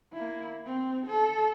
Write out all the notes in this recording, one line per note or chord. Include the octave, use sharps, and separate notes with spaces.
A#3 E4
C4
A4